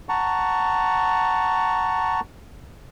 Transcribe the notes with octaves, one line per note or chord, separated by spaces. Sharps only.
F#5 A5 A#5 C#6